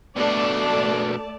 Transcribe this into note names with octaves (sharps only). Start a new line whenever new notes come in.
B2 A3 D4 D5 A5